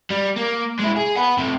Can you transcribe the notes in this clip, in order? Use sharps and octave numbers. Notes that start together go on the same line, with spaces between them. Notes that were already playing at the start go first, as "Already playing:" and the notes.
G3
A#3
G#3 E4
G#4
F#5 B5
F2 C3